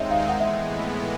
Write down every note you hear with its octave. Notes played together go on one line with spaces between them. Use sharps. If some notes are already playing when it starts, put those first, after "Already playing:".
Already playing: D#2 D#3 G#3 C4 D#4 C#5 D#5 E5
F5
A2 E3 G#3 B3 F#5
E5